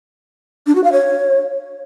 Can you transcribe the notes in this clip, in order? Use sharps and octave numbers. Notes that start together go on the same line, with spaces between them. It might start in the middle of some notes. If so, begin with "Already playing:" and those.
D4
F#4
F5
C#5